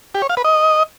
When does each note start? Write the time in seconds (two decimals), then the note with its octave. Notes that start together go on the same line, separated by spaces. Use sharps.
0.15 G4
0.22 C#5
0.30 F5
0.37 B4
0.45 D#5